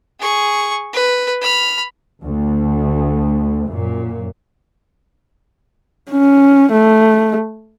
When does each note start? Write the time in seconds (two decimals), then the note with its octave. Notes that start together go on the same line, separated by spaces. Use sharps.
0.20 G#4 C#6
0.93 B4
1.42 B5 F6
2.23 D2
3.71 F#2 A#2
6.11 C#4
6.72 A3